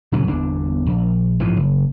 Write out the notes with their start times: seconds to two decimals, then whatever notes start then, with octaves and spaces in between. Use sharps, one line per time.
0.12 A#2 C#3 E3 F#3
0.27 G1 E2 D4
0.87 A#1
1.40 A#1 G#2 E3 F3
1.56 F#1